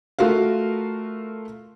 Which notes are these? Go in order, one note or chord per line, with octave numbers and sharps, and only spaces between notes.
A3 F4 F#4 A#4 F5